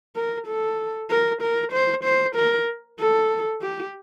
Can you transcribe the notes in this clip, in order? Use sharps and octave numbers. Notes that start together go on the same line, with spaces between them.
A#4
A4
A#4
A#4
C5
C5
A#4
A4
G4